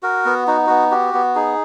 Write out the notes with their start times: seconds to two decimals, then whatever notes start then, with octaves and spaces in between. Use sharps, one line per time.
0.03 F#4 A#4
0.25 B3
0.47 D#4 F#4
0.67 B3 F#4
0.91 F#4 G4
1.14 B3
1.35 D#4 G#4